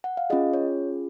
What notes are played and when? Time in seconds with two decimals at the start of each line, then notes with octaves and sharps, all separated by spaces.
0.04 F#5
0.17 F5
0.30 C#4 F4 G#4 D#5
0.53 C#5